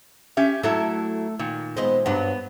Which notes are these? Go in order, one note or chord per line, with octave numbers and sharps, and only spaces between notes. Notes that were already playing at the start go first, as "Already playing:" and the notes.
C#4 G4 E5
F#3 A3 E4 A4
A#2 D#3
G#3 B3 C4
G2 F#3 B3